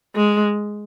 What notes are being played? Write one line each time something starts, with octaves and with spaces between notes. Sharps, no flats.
G#3